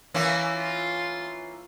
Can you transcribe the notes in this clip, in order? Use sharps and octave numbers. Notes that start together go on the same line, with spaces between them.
E3 A#3 C#4
F4 C6